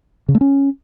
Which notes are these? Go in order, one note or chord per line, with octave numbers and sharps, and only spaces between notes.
C#3
A3
C#4